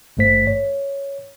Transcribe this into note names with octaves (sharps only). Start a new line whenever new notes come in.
G#1 G2 A3 C5 B6
C#5